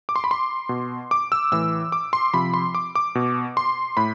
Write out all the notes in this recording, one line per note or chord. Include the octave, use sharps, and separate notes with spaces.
D6
C6
B5
C6
B2
D6
E6
A2 E3 E6
D6
C6
C3 F3 B5
C6
D6
D6
B2
C6
A2 B5